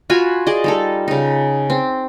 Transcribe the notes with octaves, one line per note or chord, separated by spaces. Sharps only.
F4 F#4 G#5 B5
G#4 D5 D#5
G3 D#4 A4
C#3 D#4
C4